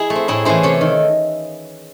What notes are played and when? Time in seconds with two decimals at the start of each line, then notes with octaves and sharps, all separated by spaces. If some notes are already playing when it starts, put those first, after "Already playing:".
Already playing: E4 G#4
0.10 A3
0.15 C4
0.28 A2 E4 G#4
0.45 E3 A3 C#4 E4 G#4 C5
0.63 C3 A4 C#5
0.81 D#3